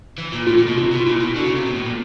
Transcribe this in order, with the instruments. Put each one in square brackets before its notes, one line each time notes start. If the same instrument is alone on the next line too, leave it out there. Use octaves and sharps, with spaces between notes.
[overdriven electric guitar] E3
A#2
[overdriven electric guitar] A2 [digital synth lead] F4
[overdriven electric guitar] A#2
B2
[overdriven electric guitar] C3 [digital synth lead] F4
[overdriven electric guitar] B2
[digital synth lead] F4
[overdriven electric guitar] A#2 [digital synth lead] E4
[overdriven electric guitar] B2
[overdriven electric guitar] D3 [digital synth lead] F#4
[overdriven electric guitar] C#3
C3
B2
A2
A#2